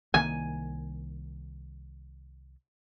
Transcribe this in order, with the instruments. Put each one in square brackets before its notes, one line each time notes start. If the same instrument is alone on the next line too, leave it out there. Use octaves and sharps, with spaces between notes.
[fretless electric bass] C2 D#3 A#3 [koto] G#5